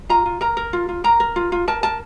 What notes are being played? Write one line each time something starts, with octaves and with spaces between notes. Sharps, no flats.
F4 A#5
F4
A#4 A#5
A#4
F4
F4
A#4 A#5
A#4
F4
F4
A#4 A5
A#4 A5